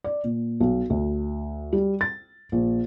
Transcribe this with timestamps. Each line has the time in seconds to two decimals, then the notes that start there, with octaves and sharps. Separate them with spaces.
0.04 D5
0.24 A#2
0.60 B1
0.90 D2
1.73 G3
2.01 A6
2.52 A#1